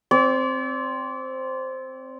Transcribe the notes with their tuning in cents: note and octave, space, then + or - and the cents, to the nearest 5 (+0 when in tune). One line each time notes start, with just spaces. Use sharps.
C4 +0 D5 -40